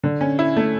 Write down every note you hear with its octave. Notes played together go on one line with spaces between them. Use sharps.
D3
C#4
E4
A3